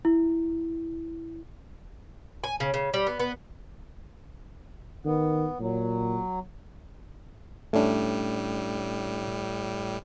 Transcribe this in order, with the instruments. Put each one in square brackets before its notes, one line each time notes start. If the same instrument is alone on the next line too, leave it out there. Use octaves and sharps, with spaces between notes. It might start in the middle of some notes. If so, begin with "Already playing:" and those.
[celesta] E4
[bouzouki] G#5
C#3
C#3
G3
B3
B3
[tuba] D#3 [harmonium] B3
[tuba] A#2 [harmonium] F#3
[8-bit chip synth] A2 G3 [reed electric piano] A3 C#4 D4